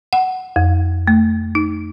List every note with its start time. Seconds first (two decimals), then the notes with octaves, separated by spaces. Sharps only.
0.13 F#5
0.56 F2
1.08 A3
1.55 D#4